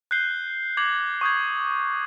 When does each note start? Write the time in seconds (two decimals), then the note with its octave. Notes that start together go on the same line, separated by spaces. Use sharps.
0.11 F#6 G6 C7 G7
0.77 D6 G#6 A#6 C#7 F#7
1.21 C#6 D#6 G6 G#6